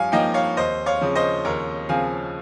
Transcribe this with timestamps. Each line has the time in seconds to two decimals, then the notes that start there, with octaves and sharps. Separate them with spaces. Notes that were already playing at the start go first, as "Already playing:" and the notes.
Already playing: G2 F3 C#5 F5 G#5
0.12 F3 A#3 D#4 D#5 G5
0.34 C#5 F5
0.57 D#2 C5 D#5
0.86 C#5 F5
1.01 C#3 F3 C4
1.15 C5 D#5
1.45 D#2 A#4 C#5
1.89 C#3 F3 C4 F5 G#5